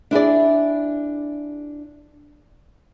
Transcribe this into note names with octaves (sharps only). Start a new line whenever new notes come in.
D4 E4 G#4 D5